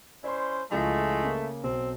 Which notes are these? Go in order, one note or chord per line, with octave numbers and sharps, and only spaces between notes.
C#4 E4 C5 D5 C6
C#2 E3 F3 G#3 A3
C#3 A#3
B1 C4